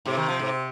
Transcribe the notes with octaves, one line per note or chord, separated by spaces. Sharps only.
G#2 C3
D#3
F3
G#2